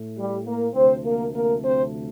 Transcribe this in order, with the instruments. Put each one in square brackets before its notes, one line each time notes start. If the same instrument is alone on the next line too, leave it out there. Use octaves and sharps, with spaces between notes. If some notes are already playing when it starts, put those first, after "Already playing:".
Already playing: [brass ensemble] A2 A3
G3 G4
A#3 A#4
D2 C3 F3 A3 C4 C5
A#3 A#4
A#3 A#4
C4 C5